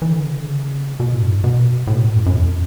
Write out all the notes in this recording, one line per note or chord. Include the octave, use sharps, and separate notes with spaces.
E3
D3
C#3
D3
C#3
B2
A2
F#2
G2
B2
A2
B2
A2
F#2
F#2
E2